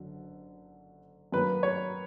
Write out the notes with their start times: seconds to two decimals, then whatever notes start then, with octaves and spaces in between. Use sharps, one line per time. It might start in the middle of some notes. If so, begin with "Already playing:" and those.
Already playing: F#1 D3 F#3
1.32 F#2 D#3 F#3 A#3 B4
1.63 C#5